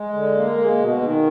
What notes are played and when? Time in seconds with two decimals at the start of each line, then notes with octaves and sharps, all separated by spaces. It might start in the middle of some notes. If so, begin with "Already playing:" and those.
Already playing: G#3
0.13 D3
0.35 A#3
0.58 G#3
0.79 B2
1.02 D#3